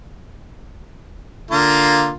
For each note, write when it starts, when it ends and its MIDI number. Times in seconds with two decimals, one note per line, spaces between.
1.51 2.14 50
1.51 2.14 58
1.51 2.14 65